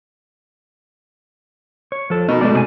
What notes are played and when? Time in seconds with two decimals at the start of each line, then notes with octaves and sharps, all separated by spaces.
1.92 C#5
2.10 F3 A4
2.28 B2 D#4 A#4
2.41 G#2 B2 G#3 A3 D5
2.53 C3 D5 G#5